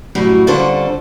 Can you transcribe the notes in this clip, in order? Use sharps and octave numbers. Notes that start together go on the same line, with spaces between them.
F#2 A2 G3 E4
F2 D3 G3 C#4 A4 C5